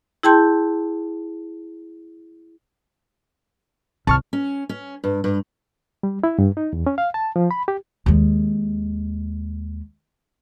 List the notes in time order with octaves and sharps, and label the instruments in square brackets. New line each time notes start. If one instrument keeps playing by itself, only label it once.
[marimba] E4 G#4 G5 A5 C6 G6
[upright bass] C2 [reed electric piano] A5 C#6 F6
[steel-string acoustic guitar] C#4
C#4
G2
G2
[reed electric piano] G3
E4
G2
D#4
E2
C#4
F5
A5
F3
B5
G4
[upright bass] D#2 G#3